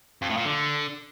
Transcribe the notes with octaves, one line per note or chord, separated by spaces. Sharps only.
F2
A2
A#2
D3